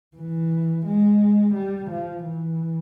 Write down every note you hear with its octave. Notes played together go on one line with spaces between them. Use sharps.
E3
G#3
G3
F3
E3